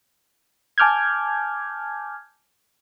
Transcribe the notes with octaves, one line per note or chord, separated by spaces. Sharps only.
G#5 A5 D6 F6 G6 G#6